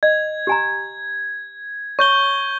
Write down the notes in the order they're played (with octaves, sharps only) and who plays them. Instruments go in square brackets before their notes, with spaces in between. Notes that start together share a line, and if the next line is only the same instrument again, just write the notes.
[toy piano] D#5 [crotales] G#6
[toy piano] G4 G#5 A#5
[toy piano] C#5 [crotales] C#6 G6 G7